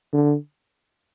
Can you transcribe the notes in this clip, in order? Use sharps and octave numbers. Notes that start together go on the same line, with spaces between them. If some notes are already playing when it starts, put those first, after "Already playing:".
D3